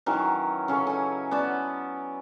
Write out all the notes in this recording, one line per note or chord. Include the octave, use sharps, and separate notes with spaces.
D#3 E3 F#3 C#4
C#3 C#4 A4
C#4 G#5
B3 C#4 D5 A5